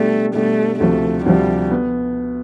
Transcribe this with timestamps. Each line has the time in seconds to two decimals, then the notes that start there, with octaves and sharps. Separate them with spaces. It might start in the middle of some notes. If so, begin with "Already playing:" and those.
Already playing: B2 G3 A3 D4
0.34 B2 G3 A3 D4
0.80 D2 C3 F3 A3
1.25 D2 C3 F3 G3
1.70 B3